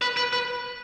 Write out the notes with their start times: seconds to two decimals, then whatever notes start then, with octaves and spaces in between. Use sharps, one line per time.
0.02 B4
0.17 B4
0.33 B4